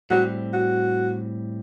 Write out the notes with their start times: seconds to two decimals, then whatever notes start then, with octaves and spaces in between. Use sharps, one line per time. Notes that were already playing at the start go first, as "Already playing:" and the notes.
0.11 A2 G3 C4 F#4
0.53 F#4